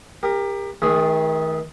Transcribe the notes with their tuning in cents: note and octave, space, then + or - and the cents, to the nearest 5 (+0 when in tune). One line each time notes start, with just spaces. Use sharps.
G4 +30 A#4 +0
D#3 +35 A3 -25 G#4 +0